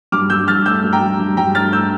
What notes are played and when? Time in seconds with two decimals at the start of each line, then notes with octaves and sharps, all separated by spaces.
0.12 G2 D6 F6
0.30 G2 E6 G6
0.48 G2 F6 A6
0.66 A3 E6 G6
0.83 G2
0.93 G5 A#5
1.01 G2
1.19 G2
1.37 G2 G5 A#5
1.55 A3 F6 A6
1.73 E6 G6